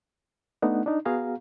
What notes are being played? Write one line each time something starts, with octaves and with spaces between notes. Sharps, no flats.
A3 B3 D4 D#4 F#5
D4 D#4
B3 F#4 G#4 F5 A#5